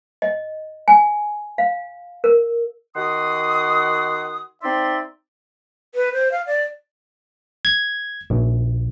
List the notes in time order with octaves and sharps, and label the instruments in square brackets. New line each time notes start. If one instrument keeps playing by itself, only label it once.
[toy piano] D#5
G#5
F5
A#4
[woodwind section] D#3 F#4 F#5 C6 D#6
C4 D#4 D5 E5 C6
[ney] B4
C5
F5
D5
[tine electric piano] G#6
A#1